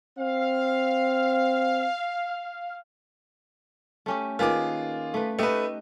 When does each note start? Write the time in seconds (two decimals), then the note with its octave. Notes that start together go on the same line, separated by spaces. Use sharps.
0.19 C4 F5
4.06 A3 C#4 G4
4.39 D#3 A#3 F4 G#4 B4 D6
5.14 A3 B4
5.39 A3 D#4 G4 B4 D#5